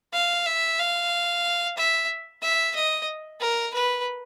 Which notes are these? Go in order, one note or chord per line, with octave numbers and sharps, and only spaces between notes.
F5
E5
F5
E5
E5
D#5
A#4
B4